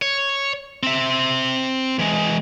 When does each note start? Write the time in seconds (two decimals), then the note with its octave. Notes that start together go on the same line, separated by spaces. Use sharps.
0.02 C#5
0.83 C4 E5
1.99 E3 G#3